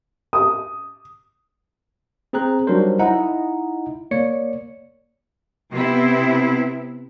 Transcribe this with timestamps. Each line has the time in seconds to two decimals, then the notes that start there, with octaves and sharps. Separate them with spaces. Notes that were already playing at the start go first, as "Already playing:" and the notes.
0.33 D#6
2.33 C4 G#4 C5 A#5 F#6
2.67 F#3 G3 D4 D#4 A#4 C5
2.99 D#4 E4 D#5 F#5 A#5
4.11 A#3 C#5 D5 C#7
5.71 C3 B3 E4